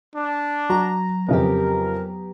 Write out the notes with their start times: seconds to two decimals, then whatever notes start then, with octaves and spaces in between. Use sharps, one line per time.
0.15 D4
0.70 F#3 F#4 A#5
1.29 F2 C#3 B3 G4 A#4